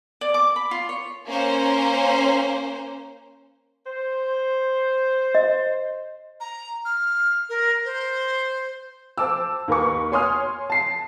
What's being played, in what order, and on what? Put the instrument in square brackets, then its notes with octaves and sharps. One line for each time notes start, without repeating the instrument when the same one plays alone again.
[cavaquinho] D5
D6
B5
F4
C#5
[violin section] A#3 C#4 C5
[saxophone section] C5
[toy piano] D#5
[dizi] A#5
F6
A#4
C5
[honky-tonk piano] C5 A5 D6 E6
D#2 A#4 B4 C#6
C#5 G#5 C6 D#6 F6
A5 C7